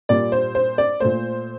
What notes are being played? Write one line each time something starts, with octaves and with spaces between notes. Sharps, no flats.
A#2 G3 A#3 D5
C5
C5
D5
A#2 A3 C5